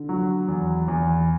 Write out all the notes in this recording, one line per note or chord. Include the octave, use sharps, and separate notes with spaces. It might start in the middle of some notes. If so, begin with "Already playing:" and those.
Already playing: D3
F#3
E2
E2